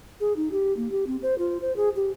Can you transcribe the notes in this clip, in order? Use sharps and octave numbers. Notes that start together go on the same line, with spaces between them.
G#4
D#4
G4
A#3
G4
C4
C5
F4
C5
G#4
G4